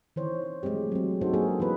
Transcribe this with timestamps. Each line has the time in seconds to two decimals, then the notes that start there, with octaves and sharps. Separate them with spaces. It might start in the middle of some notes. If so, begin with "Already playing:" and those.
0.16 D#3 E3 C5 C#5
0.63 F#3 G#3 A3 C4 G4
0.92 F#3 C4
1.21 C4 D4 D#4 F#4 A4 C5
1.33 F#3 A#3 G#4 A#4
1.60 E3 G#4 B4